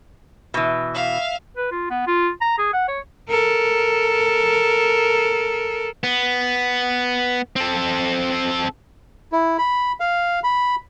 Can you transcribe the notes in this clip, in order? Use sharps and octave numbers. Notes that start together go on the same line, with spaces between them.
B2 E3
E5 F5
B4
F4
B3
F4
A#5
G#4
F#5
C#5
A4 A#4
B3
C4 A4
E4
B5
F5
B5